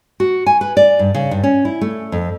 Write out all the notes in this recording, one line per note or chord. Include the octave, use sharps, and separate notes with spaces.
F#4
G#5
B4
D5
G2
C#3
G2
C#4
E4
A3
F2